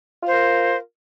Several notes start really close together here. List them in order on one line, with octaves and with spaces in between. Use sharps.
F4 C5 A#4